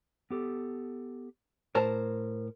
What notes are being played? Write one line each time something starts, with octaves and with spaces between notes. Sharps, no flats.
B3 G4 A4
A2 A#4 C5 A5